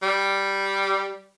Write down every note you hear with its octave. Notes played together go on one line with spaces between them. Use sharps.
G3